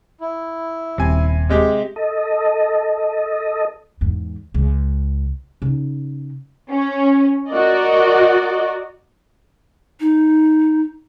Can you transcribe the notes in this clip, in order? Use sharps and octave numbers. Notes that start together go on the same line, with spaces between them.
E4
D#1 C3 G#5
C3 G#3 G4
A4 D#5
E2 G#2
C#2 C#3
C#3 D#4
C#4
F#4 A#4 D5 D#5
D#4